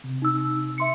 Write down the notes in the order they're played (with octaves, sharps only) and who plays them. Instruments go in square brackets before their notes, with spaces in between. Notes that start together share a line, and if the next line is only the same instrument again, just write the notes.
[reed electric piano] C3
[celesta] D#4 E6
E5 C6 C#7